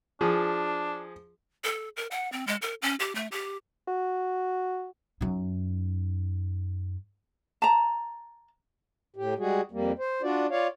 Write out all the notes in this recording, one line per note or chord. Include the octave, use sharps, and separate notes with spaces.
F3 D4 G#4
A4
A#4
F#5
C4
G#3
A#4
C#4
G4
A3
G4
F#4
F#2 D#4
A5 A#5
A2 G4
G3 G#3 F#4 G#4
F2 G3 A#3
C5
D4 F4 F#4 D5
F4 C#5 D5 F5